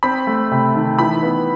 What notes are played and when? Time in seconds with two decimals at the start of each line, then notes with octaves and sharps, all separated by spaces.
0.03 C4 B5
0.27 A3
0.52 C3
0.75 D#3
0.99 E3 B5
1.23 B3